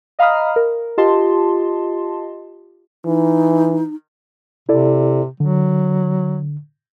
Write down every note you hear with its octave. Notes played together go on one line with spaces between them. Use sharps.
D#5 F5 A#5 B5 D#6 F6
A#4
F4 G4 D#5 A5 C6
E3 D#4
C3 E4 A4 D5
D3 F#3